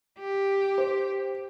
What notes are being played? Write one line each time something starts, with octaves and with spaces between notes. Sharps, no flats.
G4
C5